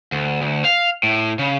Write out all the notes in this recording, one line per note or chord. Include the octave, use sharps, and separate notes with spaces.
D2
D2
F5
A2
C#3